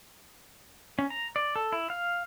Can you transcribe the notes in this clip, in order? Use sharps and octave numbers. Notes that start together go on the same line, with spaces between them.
C#4
A#5
D5
A4
E4
F5